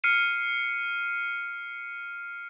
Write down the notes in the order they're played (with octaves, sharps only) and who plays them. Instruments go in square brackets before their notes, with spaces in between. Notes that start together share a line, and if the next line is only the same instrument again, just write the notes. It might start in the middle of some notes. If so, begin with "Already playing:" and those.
[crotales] F6 C7 C#7 D#7